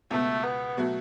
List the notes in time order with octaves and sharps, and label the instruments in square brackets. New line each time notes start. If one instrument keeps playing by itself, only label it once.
[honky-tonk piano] C#2 B2 B3 [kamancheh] A3
[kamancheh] B3
[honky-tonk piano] B2 F#3 A3 F#4